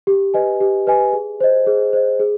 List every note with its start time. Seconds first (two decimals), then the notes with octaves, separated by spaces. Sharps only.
0.07 G4
0.34 B4 D#5 G#5
0.61 G4
0.87 B4 D#5 G#5
1.13 G#4
1.40 C5 D#5
1.67 G#4
1.93 C5 D#5
2.19 G#4